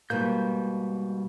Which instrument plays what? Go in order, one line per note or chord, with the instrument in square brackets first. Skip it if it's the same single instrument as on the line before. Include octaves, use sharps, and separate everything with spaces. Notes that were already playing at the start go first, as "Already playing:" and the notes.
[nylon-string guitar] G#2 B2 A#3 [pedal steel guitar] G3 G6